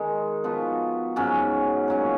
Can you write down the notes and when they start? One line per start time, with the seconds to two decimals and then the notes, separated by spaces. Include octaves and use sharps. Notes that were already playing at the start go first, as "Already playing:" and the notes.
Already playing: D#3 G#3 D#4
0.44 F3 B3 D#4 F#4
1.16 G#2 F#3 C#4
1.88 A#2 F#3 C#4